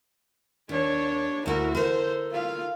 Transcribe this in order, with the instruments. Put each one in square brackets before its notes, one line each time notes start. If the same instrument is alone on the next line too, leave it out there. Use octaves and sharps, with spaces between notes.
[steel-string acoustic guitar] D#2 [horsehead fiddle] D4 C#5
[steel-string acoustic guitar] D2 E4 [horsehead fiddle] F#4 A#4
[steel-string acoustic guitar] A4 A#4 [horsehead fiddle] C5
[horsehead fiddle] F4 F5